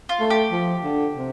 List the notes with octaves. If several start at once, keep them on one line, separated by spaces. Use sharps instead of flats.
F4
A3
G4
F3
D3
C3